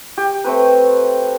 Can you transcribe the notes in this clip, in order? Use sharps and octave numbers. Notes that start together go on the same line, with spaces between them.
G4
A3 C4 B4